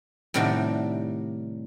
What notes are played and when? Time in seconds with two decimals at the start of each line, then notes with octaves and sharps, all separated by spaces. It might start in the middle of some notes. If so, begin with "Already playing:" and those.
0.34 A2 C3 D#3 G3 D4 F#4